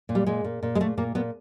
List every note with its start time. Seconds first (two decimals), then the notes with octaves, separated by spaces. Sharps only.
0.09 A#2
0.15 G3
0.26 A#2 G#3
0.44 A#2
0.63 A#2
0.75 G#3
0.80 A#2 A3
0.97 A#2 A#3
1.15 A#2 B3